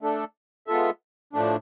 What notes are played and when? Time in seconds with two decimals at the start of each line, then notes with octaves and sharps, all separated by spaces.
0.01 A3 D4 A4
0.67 G#3 B3 F4 A4 E5
1.33 A2 F3 A3 D4